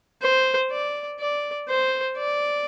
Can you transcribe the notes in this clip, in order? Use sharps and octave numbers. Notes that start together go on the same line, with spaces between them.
C5
D5
D5
C5
D5